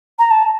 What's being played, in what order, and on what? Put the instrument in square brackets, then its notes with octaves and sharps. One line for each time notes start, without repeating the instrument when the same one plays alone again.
[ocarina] A#5
A5